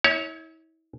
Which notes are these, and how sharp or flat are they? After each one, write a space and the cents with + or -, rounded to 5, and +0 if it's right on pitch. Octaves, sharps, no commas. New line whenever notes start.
E4 -40 C#5 +10